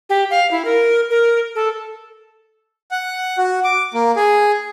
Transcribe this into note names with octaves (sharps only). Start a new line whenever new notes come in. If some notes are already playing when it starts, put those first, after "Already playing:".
G4
F5
E4
A#4
A#4
A4
F#5
F#4
D6
A#3
G#4